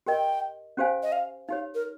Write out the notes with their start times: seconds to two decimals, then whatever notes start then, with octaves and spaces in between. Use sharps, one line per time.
0.06 G4 A#4 D#5 G5
0.77 C#4 G4 C5 F5 G#5
1.03 D#5
1.12 F5
1.48 D#4 G4 C#5 F5
1.75 A#4